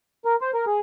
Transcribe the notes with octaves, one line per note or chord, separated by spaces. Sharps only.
A#4
C5
A#4
G#4